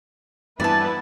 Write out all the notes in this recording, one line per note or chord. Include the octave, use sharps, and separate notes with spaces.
G2 E3 B3 E4 B4 D5 A5